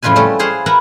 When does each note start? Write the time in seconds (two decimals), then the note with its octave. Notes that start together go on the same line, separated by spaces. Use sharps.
0.03 F2 A2 C#3 F4 B4 G#5
0.16 G3 A3 C#4 A4
0.39 E4 G#4 C5 F5 F#5
0.66 A#4 B4 E5 F#5 A#5 B5